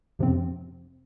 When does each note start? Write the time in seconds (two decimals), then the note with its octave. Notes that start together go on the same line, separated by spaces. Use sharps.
0.19 F2 C3 F3 C4